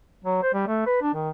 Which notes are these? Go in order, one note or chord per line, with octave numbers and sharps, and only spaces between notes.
F#3
C5
G3
A3
B4
D4
D#3